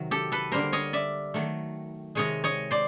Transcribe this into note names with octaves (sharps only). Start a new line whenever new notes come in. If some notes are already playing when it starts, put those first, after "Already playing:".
Already playing: C3 D#3 F#3
G4 A4
A4 B4
D3 G3 A#3 A#4 C5
C#5 D#5
D5 E5
D#3 F#3 A3
C3 D#3 G#3 C#5 D#5
C#5 D#5
C5 D5